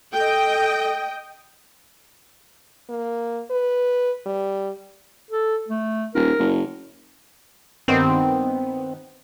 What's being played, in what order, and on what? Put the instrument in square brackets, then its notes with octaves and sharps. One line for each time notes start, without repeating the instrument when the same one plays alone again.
[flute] A4 [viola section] D#5 G5
[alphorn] A#3
B4
G3
[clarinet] A4
A3
[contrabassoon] D#1 [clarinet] A#4
[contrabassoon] F#1
[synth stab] G2 D#3 B3 [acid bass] C4